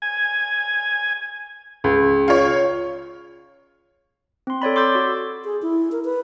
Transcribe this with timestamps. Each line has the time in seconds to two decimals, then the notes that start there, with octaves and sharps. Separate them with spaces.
0.02 G#5
1.84 C#2
2.28 F4 C#5
4.47 C4 C6
4.62 A4 C#5 D5 B5
4.75 B5 C6 D6 E6 G6 A6
4.95 F#4
5.45 G#4
5.62 E4
5.92 A#4
6.05 B4